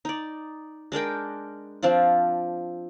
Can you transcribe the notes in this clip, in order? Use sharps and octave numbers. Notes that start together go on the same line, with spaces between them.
D#4 D5
G#3 D4 A#4 G5
F3 C4 D4 F4